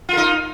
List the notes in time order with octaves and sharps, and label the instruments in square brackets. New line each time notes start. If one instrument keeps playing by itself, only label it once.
[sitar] F4
A#4
D#4